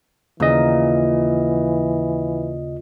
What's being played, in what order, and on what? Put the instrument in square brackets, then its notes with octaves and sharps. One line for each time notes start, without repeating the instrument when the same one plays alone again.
[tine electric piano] D#2 C#3 D#5 [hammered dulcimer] A#2 [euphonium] E3